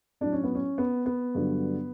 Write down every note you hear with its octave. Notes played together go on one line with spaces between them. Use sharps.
A2 F#3 D4
C#4
B3
C#4
B3
B3
G2 D3 F#3